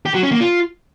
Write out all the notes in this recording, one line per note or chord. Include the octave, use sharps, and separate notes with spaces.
G4
F#3
C#4
A#3
F4